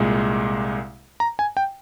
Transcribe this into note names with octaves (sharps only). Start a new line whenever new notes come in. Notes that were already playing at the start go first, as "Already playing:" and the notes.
Already playing: C2 A#2 G#3
A#5
G#5
G5